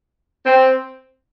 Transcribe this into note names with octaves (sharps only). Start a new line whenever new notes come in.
C4